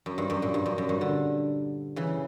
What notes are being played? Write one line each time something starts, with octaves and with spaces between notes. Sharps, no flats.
F#2
G2
F#2
A#2
G2
F#2
F#2
G2
D3
C#3 E3